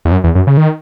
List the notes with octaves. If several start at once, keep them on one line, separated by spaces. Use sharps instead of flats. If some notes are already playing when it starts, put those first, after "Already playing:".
E2
F#2
E2
F#2
C#3
D#3